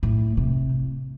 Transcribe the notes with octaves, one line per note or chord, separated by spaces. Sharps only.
A2
C3